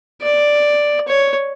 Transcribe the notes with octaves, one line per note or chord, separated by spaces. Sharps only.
D5
C#5